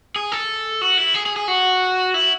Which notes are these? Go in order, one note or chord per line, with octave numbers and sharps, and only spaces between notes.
G#4
A4
F#4
E4
G#4
G#4
G#4
F#4
E4